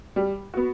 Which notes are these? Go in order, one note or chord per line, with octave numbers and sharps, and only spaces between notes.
G3
B3 F#4